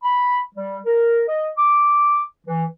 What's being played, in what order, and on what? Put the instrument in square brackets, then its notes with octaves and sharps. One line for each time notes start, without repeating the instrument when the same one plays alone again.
[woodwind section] B5
G3
A#4
D#5
D6
E3